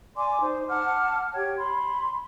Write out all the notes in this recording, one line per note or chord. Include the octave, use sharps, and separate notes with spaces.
D5 G#5 C6 D6
D#4 C5
F#5 A5 D6 F6
G4 C#5 G5 G#6
B5 C6